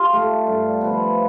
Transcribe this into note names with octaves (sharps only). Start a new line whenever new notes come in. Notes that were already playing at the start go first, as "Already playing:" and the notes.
Already playing: F4 G4
A3
G2
F3 B3